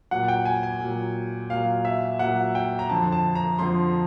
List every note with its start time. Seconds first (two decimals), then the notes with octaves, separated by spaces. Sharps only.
0.11 A#2 F#3 F#5
0.28 G5
0.45 G#5
0.63 G#5
0.81 A#2 F#3
1.50 A#2 F#3 F5
1.85 E5
2.19 A#2 F#3 F#5
2.55 G5
2.79 A#5
2.89 F2 D3 F3 A5
3.12 A5
3.35 A#5
3.59 F2 D3 F3 C6